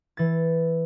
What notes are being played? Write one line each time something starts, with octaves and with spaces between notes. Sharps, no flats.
E3 A6